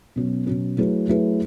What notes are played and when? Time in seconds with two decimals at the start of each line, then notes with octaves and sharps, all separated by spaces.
0.16 B2 F#3 C#4
0.47 B2 F#3 C#4
0.78 F#3 A3 E4 G#4 B4
1.08 F#3 A3 E4 G#4 B4